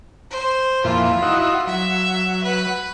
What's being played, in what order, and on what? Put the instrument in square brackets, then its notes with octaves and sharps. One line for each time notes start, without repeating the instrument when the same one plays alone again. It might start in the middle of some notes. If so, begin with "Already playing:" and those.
[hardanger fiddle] C5
[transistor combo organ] F2 A#2 E3 [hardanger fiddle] F4
[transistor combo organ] D#4 E4 F#4
[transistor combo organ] F#3 [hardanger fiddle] E5
[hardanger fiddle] B4